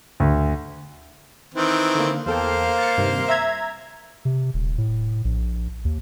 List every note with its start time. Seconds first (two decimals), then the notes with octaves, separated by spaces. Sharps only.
0.20 D2
1.54 D#3 E3 C4
1.95 D3 A#3
2.26 E2 A#3 A4 C5 F5 G5
2.78 A6 C#7
2.97 G2 C3 D#3
3.29 E5 A#5 G#6
4.25 C3
4.54 D#1
4.78 A2
5.25 A#1
5.85 D#2